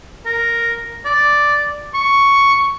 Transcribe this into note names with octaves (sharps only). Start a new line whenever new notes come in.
A#4
D5
C#6